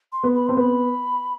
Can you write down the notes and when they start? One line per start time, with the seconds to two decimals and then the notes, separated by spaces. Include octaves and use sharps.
0.12 C6
0.23 B3
0.35 B5
0.47 C4 C6
0.57 B3 B5